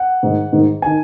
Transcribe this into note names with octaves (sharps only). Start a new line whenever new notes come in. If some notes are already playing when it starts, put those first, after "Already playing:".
Already playing: F#5
G#2 D#3
G#2 D#3
D#3 G#5